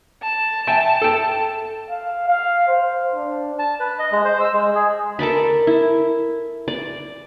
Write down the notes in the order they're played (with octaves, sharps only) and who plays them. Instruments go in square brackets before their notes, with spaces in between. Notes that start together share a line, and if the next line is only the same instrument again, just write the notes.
[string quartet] A5
[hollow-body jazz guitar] E5 G5 G#5
A4 G5
[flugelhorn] F5
F5
C5
D4
[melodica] A5
B4
D#5
G#3
C5
E6
G#3
G#4
[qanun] A4 A#4 D5 B5
E4
D5